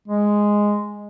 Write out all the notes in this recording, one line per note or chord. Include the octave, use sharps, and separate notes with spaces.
G#3